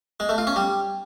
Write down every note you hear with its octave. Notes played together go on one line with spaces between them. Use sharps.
G#3
A3
F4
C#4
G3